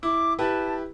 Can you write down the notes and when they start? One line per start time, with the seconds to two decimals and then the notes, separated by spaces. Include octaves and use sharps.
0.03 E4 D6
0.39 E4 G4 B4 A5